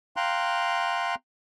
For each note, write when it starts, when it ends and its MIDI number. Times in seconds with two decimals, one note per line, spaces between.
0.17 1.15 77
0.17 1.15 79
0.17 1.15 82
0.17 1.15 84
0.17 1.15 90